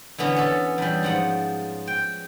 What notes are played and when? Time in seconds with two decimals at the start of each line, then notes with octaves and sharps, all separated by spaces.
0.18 D3 E3 B3 C#4
0.36 C#4 A4
0.78 E2 G3
1.03 G#2 F3 F#5
1.87 G5